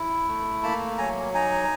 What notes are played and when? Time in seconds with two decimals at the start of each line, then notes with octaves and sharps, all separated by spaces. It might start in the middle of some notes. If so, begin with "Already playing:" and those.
Already playing: E4
0.28 A3
0.63 A#3 A5 B5
0.98 F#3 G#5 A#5
1.34 D#4 G#5 A#5